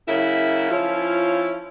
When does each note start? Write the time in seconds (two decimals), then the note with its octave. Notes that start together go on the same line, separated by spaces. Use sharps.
0.08 C#3 F#3 A#3 E4 E5
0.71 F3 C#4 E4 F4